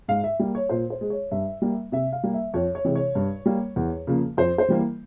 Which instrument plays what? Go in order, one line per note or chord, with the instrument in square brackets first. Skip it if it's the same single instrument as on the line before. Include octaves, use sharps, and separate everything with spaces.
[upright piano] G#2 F5
E5
G3 A#3
C#5
A#2 C5
C5
G#3
C#5
G2 E5
G3 A#3
C3 E5
F5
G3 A#3
E5
F2 C#5
C#5
C3 E3 G#3
C#5
G2
G3 A#3
E2
C#3 F3 A#3
F2 C5
C5
E3 G3 A#3